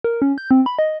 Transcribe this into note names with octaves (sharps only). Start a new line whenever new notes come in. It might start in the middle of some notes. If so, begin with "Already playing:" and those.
A#4
C#4
G6
C4
B5
D#5